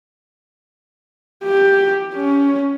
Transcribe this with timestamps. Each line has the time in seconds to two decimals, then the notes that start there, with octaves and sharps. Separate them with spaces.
1.45 G4
2.15 C#4